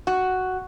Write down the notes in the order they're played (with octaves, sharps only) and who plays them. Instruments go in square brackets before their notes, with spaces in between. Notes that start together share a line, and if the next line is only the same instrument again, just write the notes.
[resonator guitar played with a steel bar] F#4